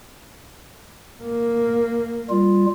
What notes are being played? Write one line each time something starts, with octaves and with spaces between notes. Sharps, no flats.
A#3
G3 F4